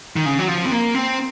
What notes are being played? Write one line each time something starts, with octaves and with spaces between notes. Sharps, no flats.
D#3
C#3
F#3
F3
C4
A#3
C4